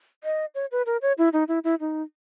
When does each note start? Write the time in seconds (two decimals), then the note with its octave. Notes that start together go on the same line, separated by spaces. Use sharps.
0.24 D#5
0.55 C#5
0.71 B4
0.86 A#4
1.02 C#5
1.18 E4
1.33 D#4
1.48 E4
1.64 E4
1.80 D#4